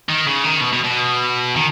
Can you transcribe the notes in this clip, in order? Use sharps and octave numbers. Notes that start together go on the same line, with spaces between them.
D#3
C#3
D#3
B2
B2
B2
D#3